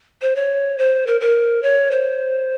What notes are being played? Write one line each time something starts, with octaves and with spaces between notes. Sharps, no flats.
C5
C#5
C5
A#4
A#4
C#5
C5